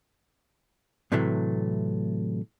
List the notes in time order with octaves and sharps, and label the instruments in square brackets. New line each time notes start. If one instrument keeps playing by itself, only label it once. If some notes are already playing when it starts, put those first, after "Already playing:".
[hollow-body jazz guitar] A2 C3 E3 F#3 A3